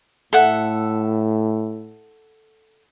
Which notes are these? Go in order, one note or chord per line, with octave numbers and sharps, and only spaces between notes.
A2 A4 E5 F#5